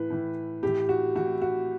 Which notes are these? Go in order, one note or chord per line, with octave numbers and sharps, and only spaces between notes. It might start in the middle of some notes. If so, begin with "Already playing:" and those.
Already playing: A2 E3 B4
A2 E3
A2 E3 G4
F#4
A2 E3 F#4
F#4